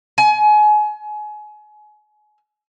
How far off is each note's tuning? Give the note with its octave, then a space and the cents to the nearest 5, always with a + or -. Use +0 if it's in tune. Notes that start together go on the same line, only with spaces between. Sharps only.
G#5 +30